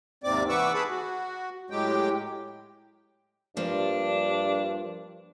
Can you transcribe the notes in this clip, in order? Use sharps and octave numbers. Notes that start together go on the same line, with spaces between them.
D#2 G#2 C3 C4 D5 D6
E3 B4 F#5 C#6 D6 E6
G#4 B4 A5 B5
F#4
A2 F#3 G#3 G4 G5
G2 F3 A#3 D4